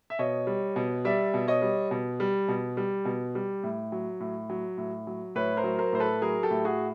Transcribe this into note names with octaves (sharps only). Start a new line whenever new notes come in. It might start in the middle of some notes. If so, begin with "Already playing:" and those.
E5
B2 C#5 D#5
G3
B2
G3 D5 E5
B2
C#5 D#5
G3
B2
G3
B2
G3
B2
G3
A2
F#3
A2
F#3
A2
F#3
A2 B4 C#5
A#4 C5
F#3
A#4 C5
A2 C5
A4 B4
F#3 G#4 A#4
G4 A4
A2
F#4 G#4